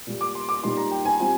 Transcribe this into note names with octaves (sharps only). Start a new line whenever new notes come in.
A#2 G3 A#3
D6
C6
D6
A#2 G3 A#3 D#4 C6
A#5
G5
G#5
G3 C4 F4